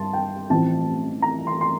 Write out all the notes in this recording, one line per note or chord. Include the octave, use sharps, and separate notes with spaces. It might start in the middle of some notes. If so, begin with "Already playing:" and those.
Already playing: G2 A5 C6
G5
A1 A2 F3 C4 A5
A#5
C6
C6